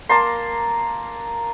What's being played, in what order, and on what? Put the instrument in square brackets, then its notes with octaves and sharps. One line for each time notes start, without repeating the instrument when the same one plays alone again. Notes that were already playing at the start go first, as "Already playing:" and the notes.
[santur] A#3 A5 A#5 C6